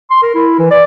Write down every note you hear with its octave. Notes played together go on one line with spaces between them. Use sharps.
C6
A#4
E4
E3
D5